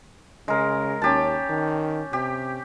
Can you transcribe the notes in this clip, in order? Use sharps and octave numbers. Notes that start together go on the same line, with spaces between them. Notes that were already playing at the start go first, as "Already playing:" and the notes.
C#3 G#3 A#4
D#2 C#4 G4 A5
D#3
C3 G4